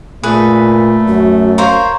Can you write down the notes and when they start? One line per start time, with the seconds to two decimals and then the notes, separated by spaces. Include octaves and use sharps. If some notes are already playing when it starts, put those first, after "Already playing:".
0.23 A#2 A3 G#4 B4
1.08 F#2 F#4
1.58 A#4 C5 C#5 F5